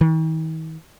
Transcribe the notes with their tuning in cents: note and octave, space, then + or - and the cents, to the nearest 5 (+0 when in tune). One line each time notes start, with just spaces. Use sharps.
D#3 +45